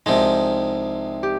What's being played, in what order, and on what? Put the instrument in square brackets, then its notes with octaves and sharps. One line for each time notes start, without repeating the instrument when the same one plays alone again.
[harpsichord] C2 C3 F3 G#3 [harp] D#4
[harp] G4